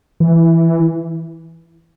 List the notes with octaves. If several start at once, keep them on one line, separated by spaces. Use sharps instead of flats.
E3